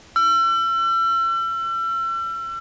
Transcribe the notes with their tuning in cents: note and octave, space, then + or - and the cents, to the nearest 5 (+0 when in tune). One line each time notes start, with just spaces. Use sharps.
E6 +40